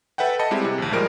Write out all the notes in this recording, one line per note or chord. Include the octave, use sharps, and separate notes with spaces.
A4 B4 E5 F#5 G5
D#5 A5 B5 C#7
G3 G#3 C4 E4 G4
C3
A#1 D#2
A2 F3 G3 G#3 A#4 D7